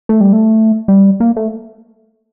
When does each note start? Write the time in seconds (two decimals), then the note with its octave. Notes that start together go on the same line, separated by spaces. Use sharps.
0.09 A3
0.21 G3
0.33 A3
0.88 G3
1.20 A#3
1.37 A3